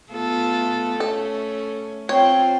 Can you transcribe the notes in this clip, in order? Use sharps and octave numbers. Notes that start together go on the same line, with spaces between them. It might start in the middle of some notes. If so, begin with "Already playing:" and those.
A3 B3 F4 A4
C#4 A4
C4 F4 C#5 G5